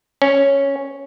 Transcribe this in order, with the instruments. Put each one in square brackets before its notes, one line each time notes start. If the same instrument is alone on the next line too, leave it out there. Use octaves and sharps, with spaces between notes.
[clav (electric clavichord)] C#4